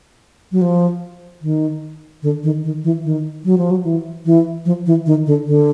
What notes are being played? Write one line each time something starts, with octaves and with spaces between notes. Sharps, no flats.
F#3
F3
D#3
D3
D#3
D#3
E3
D#3
F#3
F3
F#3
E3
E3
F3
E3
D#3
D3
D3